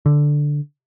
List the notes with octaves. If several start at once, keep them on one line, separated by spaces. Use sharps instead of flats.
D3